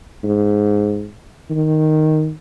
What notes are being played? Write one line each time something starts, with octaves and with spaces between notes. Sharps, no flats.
G#2
D#3